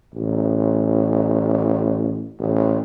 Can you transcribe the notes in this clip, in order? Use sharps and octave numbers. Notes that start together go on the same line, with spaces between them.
A1
A1